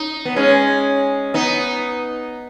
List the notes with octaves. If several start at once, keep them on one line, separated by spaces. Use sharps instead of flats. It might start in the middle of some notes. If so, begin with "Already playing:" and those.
Already playing: D#4
B3
G#3 C#4
B3 D#4